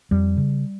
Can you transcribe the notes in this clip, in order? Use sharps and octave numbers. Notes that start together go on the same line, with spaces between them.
F2 G3
C#3